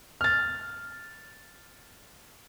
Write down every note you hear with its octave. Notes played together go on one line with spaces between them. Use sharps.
F6 A6